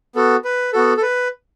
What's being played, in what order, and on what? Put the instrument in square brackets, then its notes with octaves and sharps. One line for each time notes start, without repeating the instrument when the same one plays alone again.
[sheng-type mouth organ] B3 F#4 A4
B4
B3 F#4 A4
A4
B4